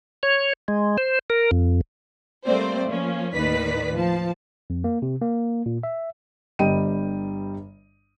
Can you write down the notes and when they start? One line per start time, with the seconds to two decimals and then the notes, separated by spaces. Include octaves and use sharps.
0.23 C#5
0.68 G#3
0.98 C5
1.30 A#4
1.51 F2
2.45 G3 A3 A#3 C4 C5 D5
2.87 F3 A#3 C#4
3.33 D#2 A2 D#3 B4 D5 B6
3.94 F3 A5
4.70 F2
4.84 A#3
5.02 C3
5.21 A#3
5.66 A#2
5.83 E5
6.59 G1 G2 G3 D#5 G5 D#7